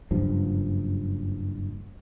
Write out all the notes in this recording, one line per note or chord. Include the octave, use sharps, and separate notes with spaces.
F#1 G2 F3